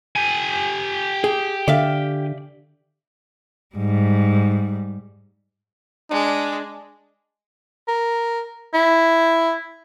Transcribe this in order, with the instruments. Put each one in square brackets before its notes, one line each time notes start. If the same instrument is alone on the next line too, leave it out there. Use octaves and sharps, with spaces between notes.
[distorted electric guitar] G4 G#5
[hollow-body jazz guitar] G#4
[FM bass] D3 [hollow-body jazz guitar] D5 E5 F5
[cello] G#2 G3
[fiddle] G#3 [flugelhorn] D4
[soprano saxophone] A#4
E4